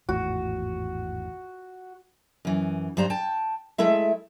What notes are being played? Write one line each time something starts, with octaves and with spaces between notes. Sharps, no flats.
G#1 E2 A2 F#4
F#2 E3
G2 G3 C5 A#5
G5 A5
G#3 A3 E4 E5